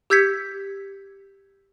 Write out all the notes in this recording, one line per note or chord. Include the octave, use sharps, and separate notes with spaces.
G4 E6 G6 G#6 B6 C#7